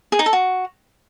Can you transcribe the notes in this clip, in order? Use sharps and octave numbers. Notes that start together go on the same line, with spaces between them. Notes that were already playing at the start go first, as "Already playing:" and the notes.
G#4
D#4
A4
F#4